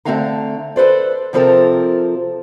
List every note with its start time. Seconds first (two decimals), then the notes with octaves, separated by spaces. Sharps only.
0.05 D3 A3 C4 F#4 F5 A#5
0.76 A4 B4 C5 D5
1.33 C3 F3 C4 F4 A4 A#4